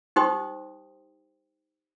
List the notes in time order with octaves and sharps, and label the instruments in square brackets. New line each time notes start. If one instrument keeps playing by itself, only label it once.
[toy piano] D#4 G4 C5 G5 C6 D#6